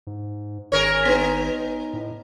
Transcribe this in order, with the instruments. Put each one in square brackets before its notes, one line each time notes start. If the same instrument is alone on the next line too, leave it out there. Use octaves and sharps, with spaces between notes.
[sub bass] G#2
[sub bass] G#1 [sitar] G#4 A#4 C#5
[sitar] B3 D#4
[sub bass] A2